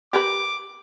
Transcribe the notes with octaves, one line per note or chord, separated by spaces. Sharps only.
G4 A#4 B4 D6